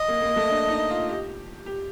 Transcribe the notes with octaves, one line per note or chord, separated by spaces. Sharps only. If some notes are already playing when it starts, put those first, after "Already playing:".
Already playing: D#5
A#3
A#3
A3
D4
D#4
F4
G4
G4